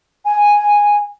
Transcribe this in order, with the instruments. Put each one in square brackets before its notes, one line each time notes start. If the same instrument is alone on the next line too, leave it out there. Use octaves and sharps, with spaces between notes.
[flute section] G#5